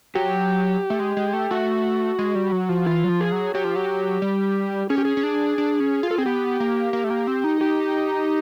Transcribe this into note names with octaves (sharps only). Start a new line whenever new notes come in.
F#3 G4
A3
G#3
G#3
A3
A3 F#4
G#3
G3
F#3
F3
E3 F4
F#3
F3
G#4
F#3
F#3 G4
F3
F#3
G3
C#4 G#4
G4
G#4
C#4
D4
D4
C#4
F4
A4
C4 G#4
B3 G4
A#3
A#3
A3
A#3
C4
D#4
G4